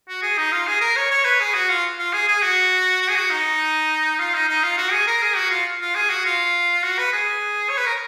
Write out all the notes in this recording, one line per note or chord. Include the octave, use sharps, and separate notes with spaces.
F#4
G#4
D#4
F4
G#4
A#4
C#5
C#5
B4
G#4
F#4
F4
F4
G#4
G#4
F#4
F#4
G#4
F#4
D#4
F4
D#4
D#4
F4
F#4
G#4
A#4
G#4
F#4
F4
F4
G#4
F#4
F4
F#4
B4
G#4
C#5
B4
A#4